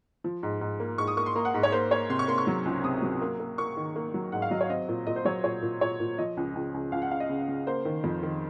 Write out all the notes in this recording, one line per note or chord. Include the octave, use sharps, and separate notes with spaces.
F3
G#2
G#2
A#3
G#2 C#6
D#6
A#3 C#6
C6
A#3 A#5
F#5
G#2
C#5
A#3 C5
A#3 C#5
C3 C6
C#6
A#3 C6
C#6
F#3
C#2
C3 D#6
F#3
A#3
A#3
A#3 C#6
D#3
A#3
F#3
G#2 F#5
F5
F#3 D#5
C#5
C4 D#5
A#2
A#2 D#5
C5
F#3 C#5
A#2 C#5
A#2
A#2 C#5
A#2
F3 D#5
C#2
C#2
C#2
C#2 F5
F#5
C#2 F5
D#5
C#3
C#3
A#3 C5
D#3
F2
D#3